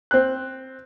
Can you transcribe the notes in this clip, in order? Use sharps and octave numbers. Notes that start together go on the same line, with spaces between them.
C4 F#6